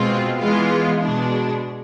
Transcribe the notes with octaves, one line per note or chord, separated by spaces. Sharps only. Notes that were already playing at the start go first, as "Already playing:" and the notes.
Already playing: B2 G#3 C4 F4
E3 G#3 B3 F4
B2 G#3 D4